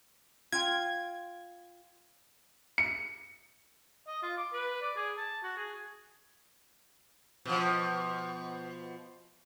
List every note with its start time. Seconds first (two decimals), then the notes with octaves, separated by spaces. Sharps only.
0.52 F4 G5 G#6
2.78 C#7
4.07 D#5
4.22 F4
4.37 D6
4.53 B4
4.81 D5
4.96 G#4
5.17 A5
5.43 F#4
5.57 G#4
7.45 B2 F3